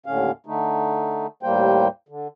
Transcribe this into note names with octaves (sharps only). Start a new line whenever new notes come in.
D#2 A2 D3 C#4 F5
D3 A3 D#4
D#2 A2 G3 A#3 C5 G5
D3